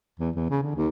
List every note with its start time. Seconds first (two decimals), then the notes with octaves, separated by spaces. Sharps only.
0.20 E2
0.36 E2
0.50 C#3
0.63 D3
0.76 D#2